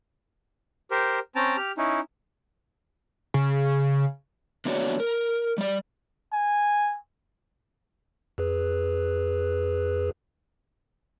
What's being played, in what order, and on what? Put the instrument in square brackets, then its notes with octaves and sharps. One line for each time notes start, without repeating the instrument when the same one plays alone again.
[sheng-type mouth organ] G4 A#4 C5
C4 C#4 G5 A5 A#5
G4 F6
C#4 D#4 E4
[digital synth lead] C#3
[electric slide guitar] D3 A#3 B3 F#4 C#5 D5
A#4
G3 D5
[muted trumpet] G#5
[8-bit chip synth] F2 G#4 B4